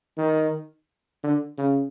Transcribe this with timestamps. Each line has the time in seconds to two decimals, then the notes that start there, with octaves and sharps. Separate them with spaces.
0.17 D#3
1.24 D3
1.58 C#3